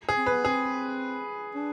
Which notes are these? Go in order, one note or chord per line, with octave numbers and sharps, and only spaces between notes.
G#4
C4
B4
B3
C4 G#4
D4